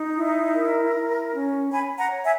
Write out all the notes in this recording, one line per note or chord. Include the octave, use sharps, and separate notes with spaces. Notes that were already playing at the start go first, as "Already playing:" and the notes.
Already playing: D#4
E4
A#4
E4
C#4
C#5 G#5 B5
F#5 A#5
C#5
E5 G#5